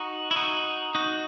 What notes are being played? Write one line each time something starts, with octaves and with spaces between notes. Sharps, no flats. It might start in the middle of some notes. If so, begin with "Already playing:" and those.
Already playing: D#4 F#4
E4
D#4 F#4
D#4 F#4